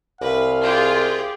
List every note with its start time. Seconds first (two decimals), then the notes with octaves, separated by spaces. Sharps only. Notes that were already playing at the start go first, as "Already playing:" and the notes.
0.21 C2 B4 F5
0.63 F4 G4 G#4